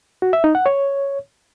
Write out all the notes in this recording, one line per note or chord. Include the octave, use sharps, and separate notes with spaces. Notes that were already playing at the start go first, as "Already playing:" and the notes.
F#4
E5
D#4
F#5
C#5